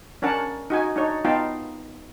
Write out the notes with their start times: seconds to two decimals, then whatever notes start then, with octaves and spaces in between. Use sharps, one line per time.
0.22 C#4 D4 A#4 F#5 A5
0.70 D#4 F#4 G#5
0.96 D4 D#4 C#5
1.25 B3 D#4 F4 F5 G5 A5